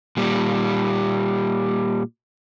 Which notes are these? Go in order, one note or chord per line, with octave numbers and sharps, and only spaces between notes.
A#2 G3